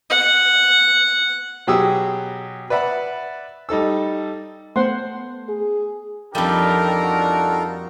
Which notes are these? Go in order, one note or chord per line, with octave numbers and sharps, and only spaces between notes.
F#5
B2 F#3 G4 G#4 D#6 E6
B4 D5 E5 F#5 B5
G3 D#4 A4 E6
A3 B3 C5 F#5 C6
G#4
F2 G3 D4 D#4 F4 G4 A4 A#4
F#4